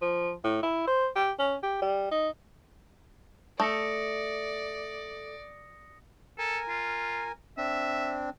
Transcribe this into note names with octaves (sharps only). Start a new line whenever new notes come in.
F3
A2
E4
C5
G4
C#4
G4
G3
D#4
A3 D5 D#6 A#6 C#7
A4 A#4 G#5
F4
C4 D4 E5